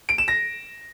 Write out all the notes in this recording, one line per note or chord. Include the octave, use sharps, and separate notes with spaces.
D7
E7
A#6